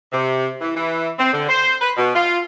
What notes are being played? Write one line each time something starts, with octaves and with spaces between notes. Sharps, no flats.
C3
E3
E3
C4
D3
C5
B4
B2
F4